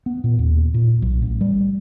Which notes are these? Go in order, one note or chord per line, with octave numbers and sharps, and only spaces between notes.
B3
A#2
D#2
A#2
B1
A1
G3